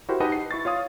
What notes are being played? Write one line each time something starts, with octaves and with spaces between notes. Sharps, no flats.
E4 F#4 G4 A#4 C5
D#4 G4 B4 D#5 F#5 A5
C7
E4 C#6 A6
F4 C#5 F5 D#6